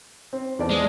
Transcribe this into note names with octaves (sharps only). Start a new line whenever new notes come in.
C4
E2 D5 A5
G#3